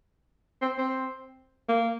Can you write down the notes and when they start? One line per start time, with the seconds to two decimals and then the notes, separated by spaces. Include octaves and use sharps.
0.62 C4
0.78 C4
1.69 A#3